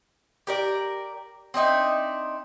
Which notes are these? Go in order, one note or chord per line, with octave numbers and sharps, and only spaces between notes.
G4 A#4 D5
C4 D4 D#4 E5